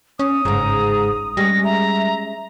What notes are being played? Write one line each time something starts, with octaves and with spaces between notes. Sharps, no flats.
C#4 D#6
G1 G#2 C#3 A#5
G3 G#3 C#4 A#6
E5 A#5